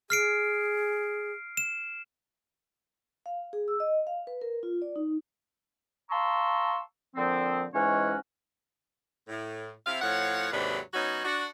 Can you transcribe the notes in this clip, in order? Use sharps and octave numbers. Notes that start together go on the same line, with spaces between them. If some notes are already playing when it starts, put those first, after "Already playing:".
G#4 F6 C7 D7
E7
F5
G#4
E6
D#5
F5
B4
A#4
F4
D5
D#4
F5 A5 A#5 C6 C#6 E6
A#2 D3 F3 C4
G#2 E3 G#3 C#4 F#4 C#5
A2
C3 E4 F5
A2 F3 C#5 F5 F#5
D#2 G#2 C3 F#3 D4 B4
F#3 B3 C#4 D#4 F#4
D4 F#4